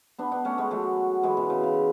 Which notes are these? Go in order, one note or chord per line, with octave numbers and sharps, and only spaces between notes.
B3 D4
B3 D4
A3 C#4
G#3 B3
F#3 A3
E3 G#3
B2
C#3
C#3